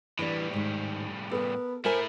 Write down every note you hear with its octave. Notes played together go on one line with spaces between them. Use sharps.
A2 E3 G3 A#3 D4
G#2 D#3
B3 A4 A#4
A3 E4 A#4 C5 E5 G#5